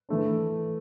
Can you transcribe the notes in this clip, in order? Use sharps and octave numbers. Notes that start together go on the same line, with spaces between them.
E3 A3 D4